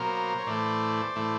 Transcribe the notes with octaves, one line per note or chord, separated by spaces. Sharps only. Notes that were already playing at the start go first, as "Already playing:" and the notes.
Already playing: B2 F#3 A#3 A#4 C5
C#5
A2 E3 A3 C5 D5
A2 E3 A3